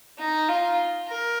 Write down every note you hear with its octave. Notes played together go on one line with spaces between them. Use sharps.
D#4
F4
A#4